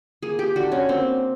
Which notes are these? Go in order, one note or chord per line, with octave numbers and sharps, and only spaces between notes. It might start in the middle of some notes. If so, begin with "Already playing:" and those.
A#3 G#4
G4
D3 F#4
C#4
A#3 C4